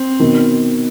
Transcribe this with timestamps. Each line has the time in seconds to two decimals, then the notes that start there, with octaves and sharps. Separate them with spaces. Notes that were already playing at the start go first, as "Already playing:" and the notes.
Already playing: C4
0.20 B2 D#3